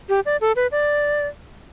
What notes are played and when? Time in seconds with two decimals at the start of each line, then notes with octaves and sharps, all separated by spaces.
0.09 G4
0.26 D5
0.41 A4
0.56 B4
0.72 D5